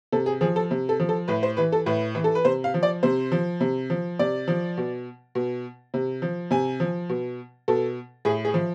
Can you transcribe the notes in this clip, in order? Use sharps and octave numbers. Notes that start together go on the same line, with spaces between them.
C3 A4
G#4
F3 G#4
A4
C3
A4
F3
A4
A2 B4
C5
E3 B4
A4
A2 B4
E3
A4
B4
C3 C5
F5
F3
D5
C3 C5
F3
C3
F3
C3 D5
F3
B2
B2
C3
F3
C3 G#5
F3
B2
B2 A4
A2 G#4
G#4
F3